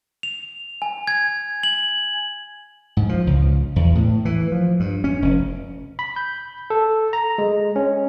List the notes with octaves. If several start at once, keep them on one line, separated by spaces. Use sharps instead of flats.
F7
G#5
G#6
F#7
G#2
F3
C#2
E2
A2
E3
F3
G2
C#4
F1
B5
G6
A4
A#5
G#3
C#4